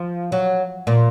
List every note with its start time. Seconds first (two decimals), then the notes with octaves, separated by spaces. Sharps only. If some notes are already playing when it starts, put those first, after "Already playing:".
Already playing: F3
0.32 F#3
0.87 A#2